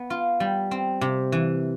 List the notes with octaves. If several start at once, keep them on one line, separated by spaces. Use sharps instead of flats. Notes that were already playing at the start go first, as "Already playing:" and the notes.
Already playing: B3
F4
G3
C4
C3
E3